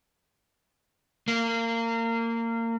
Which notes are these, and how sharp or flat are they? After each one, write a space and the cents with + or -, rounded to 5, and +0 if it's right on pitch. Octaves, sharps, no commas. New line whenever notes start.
A#3 -25